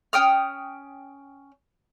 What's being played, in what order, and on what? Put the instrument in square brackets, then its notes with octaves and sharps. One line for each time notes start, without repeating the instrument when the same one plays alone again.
[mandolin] C#4 G5 D#6 F6